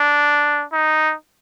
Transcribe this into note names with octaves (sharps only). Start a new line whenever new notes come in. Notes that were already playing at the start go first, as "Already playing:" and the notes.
Already playing: D4
D#4